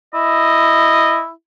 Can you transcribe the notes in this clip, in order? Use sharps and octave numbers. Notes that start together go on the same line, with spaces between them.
E4 D#5